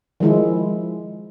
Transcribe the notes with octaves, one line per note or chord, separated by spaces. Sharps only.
D#3 F3 G#3 E4